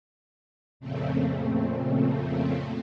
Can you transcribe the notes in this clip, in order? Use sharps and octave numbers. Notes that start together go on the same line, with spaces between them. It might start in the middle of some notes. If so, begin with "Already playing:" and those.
F2 A#2 C#3 A3 C4